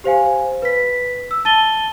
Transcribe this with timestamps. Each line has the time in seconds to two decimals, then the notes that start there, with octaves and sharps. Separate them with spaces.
0.04 G4 C5 F5 G#5
0.62 B4 B6
1.31 E6
1.45 A5 A6 D#7 G7